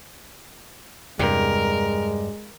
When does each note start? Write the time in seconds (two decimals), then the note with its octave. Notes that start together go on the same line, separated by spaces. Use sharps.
1.19 E2 G2 C3 G#3 A#4